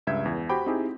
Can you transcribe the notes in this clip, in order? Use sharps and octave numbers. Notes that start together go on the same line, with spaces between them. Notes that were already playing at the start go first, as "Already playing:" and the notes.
C#2 G2 E5 G6 G#6
E2
F#4 G4 C5 G5 B5 D6
C4 D#4 E4 G4 G#4